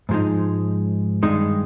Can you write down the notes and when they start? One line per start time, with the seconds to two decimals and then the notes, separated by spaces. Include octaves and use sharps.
0.09 G#2 F3 G#3 D#4
1.23 G2 D#3 G#3 D#4